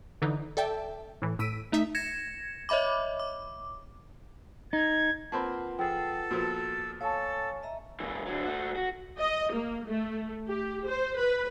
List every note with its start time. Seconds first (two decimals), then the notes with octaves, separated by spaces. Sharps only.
0.22 D3 E3 D#4
0.57 A4 D5 E5 G5 A5
1.22 A2 E3
1.39 A2 E6 B6 D7 D#7
1.72 A3 D#4 E5 B6
1.95 G#6 A#6 C#7 E7
2.69 C#5 D#5 E5 B5 D6
3.20 D6
4.73 D#4 G#6
5.32 A#3 C4 F4 B4 C5 F#5 A5 B5
5.79 F3 G#4 A4 G5
6.31 A#2 F3 B3 F#4
7.01 A4 C#5 F5 G#5 A5 C#6
7.63 D#5 E5 A#5
8.00 C#2 E3
8.26 D3 F#3
8.45 A3 F#4
8.76 F#4
9.19 D#5
9.52 A#3
9.86 A3
10.49 G4
10.88 C5
11.18 B4